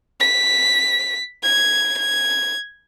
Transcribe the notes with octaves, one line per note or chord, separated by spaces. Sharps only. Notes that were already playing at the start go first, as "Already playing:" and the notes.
B6
G#6
G#6